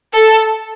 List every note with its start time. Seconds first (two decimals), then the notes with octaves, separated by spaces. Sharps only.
0.13 A4